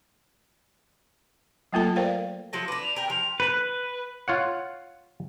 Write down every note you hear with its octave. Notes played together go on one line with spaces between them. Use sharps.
F#3 A3 A#3 F4 A4 A5
A#4 C5 D5 F5 G5
F3 F#3 A3 A#6
D4 B4 D6
F7
A#4 G5
F3 F7
B4
F4 C#5 F#5